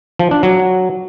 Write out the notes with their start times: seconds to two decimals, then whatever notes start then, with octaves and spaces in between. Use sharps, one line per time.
0.19 F3
0.31 D4
0.43 F#3